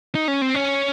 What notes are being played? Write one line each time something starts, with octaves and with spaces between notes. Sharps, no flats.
D#4
C#4
C4
C#4